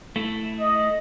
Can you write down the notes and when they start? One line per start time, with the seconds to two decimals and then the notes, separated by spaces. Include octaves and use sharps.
0.16 A3 E4
0.60 D#5